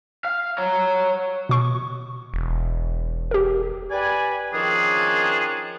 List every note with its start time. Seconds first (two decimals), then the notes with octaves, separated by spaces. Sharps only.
0.25 F5
0.58 C#5 A#5
1.49 B2 C#6
2.34 E1
3.31 G4 A#4
3.91 G4 B4 D5 G#5
4.53 D#3 F3 C#4 D4 G#4